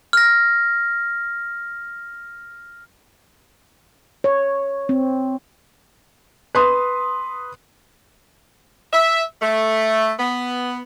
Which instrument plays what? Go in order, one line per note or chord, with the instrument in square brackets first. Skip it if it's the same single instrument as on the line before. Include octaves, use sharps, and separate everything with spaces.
[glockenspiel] F6 A#6
[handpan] C#5
C4
[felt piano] B4 C6 D#6
[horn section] E5
A3
B3